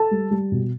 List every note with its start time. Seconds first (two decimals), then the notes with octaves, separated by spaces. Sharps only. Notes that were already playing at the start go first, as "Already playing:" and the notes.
Already playing: A4 A5
0.11 G3
0.31 G3
0.52 B2